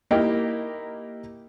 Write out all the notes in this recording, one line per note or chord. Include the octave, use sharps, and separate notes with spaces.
A#3 D#4 E4 G4 A#4 G5